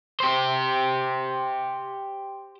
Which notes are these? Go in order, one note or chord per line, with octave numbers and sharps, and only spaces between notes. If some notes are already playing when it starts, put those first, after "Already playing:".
G4 C5